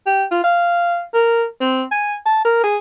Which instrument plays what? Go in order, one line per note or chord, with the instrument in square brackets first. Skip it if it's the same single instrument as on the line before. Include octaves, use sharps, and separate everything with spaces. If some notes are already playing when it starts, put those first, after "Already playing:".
[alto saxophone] G4
F4
F5
A#4
C4
G#5
A5
A#4
G#4